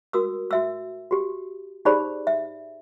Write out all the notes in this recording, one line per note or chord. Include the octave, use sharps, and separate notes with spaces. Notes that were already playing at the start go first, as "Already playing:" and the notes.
F#4 A#4 D#6 E6
F#4 E5 E6
F#4 G4
D#4 G4 G#4 C5 D5 B5
E5